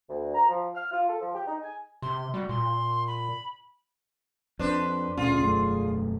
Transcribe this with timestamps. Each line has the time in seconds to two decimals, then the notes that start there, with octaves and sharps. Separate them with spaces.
0.09 D2
0.35 A#5
0.49 F3
0.75 F6
0.91 F4
1.09 A4
1.21 F3
1.35 G4
1.47 D#4
1.62 G#5
2.02 C3 C6
2.34 G3 F#4
2.49 A#2 C6
3.07 B5
4.59 F2 D4 B4 C5
5.17 D2 A#2 C#4 F4 G#4
5.39 E1 F#2 A3